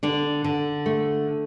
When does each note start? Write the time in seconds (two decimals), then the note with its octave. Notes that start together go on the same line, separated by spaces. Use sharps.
0.03 D3 D4
0.44 D3
0.86 A3